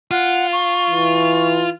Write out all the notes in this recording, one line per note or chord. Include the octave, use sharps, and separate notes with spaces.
F4 F#5
C#6
E3